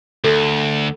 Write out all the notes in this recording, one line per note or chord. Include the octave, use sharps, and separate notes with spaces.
D2 A4